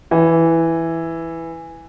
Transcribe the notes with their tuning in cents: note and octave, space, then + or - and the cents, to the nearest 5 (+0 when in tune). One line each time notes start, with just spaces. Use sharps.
E3 +0